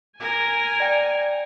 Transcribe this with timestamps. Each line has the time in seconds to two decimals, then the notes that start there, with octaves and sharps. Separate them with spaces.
0.20 A#4 G#5
0.80 D5 G5